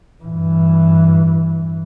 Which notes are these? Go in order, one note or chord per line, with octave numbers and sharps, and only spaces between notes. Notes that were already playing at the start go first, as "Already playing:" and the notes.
G2 E3